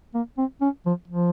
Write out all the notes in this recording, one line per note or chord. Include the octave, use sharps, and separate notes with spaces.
A#3
C4
C#4
F3
F3